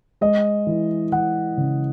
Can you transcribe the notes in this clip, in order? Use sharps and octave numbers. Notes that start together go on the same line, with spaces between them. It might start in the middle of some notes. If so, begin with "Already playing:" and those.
G#3 D#5
E3
E3 F#5
C#3